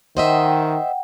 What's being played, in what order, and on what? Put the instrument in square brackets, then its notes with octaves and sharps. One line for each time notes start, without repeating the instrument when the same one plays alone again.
[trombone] D#3 [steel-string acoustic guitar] C5 D#5 E5 [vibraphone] F#5 G5